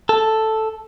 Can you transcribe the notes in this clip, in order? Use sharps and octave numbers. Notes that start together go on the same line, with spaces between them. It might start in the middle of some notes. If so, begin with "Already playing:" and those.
A4